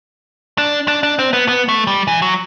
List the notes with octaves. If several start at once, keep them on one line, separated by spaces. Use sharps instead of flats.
D4
D4
D4
C4
B3
B3
A3
G3
E3
F#3